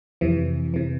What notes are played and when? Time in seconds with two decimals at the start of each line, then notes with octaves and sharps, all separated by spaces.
0.21 F2 C3 E3
0.74 C3 E3